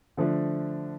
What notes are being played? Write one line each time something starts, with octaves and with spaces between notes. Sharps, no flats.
D3 F3 A3 D4